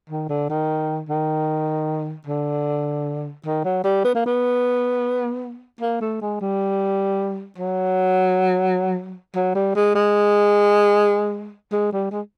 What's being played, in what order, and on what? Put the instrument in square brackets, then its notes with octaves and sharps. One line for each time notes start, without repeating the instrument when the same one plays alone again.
[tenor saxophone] D#3
D3
D#3
D#3
D3
D#3
F#3
G3
B3
A#3
B3
A#3
A3
G#3
G3
F#3
F#3
G3
G#3
G#3
G#3
G3
G#3